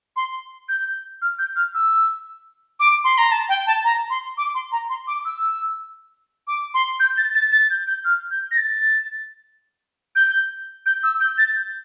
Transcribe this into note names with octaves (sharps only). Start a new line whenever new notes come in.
C6
G6
F6
G6
F6
E6
D6
C6
A#5
A5
G5
A5
A#5
C6
D6
C6
A#5
C6
D6
E6
D6
C6
G6
A6
A6
A6
G6
G6
F6
G6
A#6
A6
G6
G6
E6
G6
A6
G6